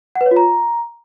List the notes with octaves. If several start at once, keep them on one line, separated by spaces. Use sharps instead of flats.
F#5
B4
C#5
F4
A#5